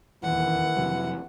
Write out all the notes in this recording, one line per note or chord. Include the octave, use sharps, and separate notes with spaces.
D#1 E2 D#3 E3 F#5
F2 C3 F#3